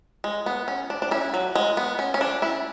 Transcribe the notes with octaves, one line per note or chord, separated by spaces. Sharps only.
G#3
B3
C#4
D4
D4
C#4 E4
F#3
G#3
B3
C#4
C#4
D4
C#4 E4